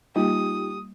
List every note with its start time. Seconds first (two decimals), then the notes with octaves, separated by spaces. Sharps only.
0.16 G3 A#3 D#4 F4 G4 D#6